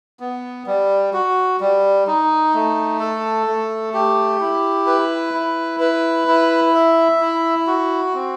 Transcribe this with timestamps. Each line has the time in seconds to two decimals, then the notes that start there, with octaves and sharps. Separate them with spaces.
0.20 B3
0.67 G3
1.13 F#4
1.60 G3
2.07 D#4
2.54 A3
3.00 A4
3.47 A3
3.94 G4
4.41 E4
4.87 B4
5.34 E4
5.80 B4
6.28 E4
6.74 E5
7.20 E4
7.67 F#4
8.15 C4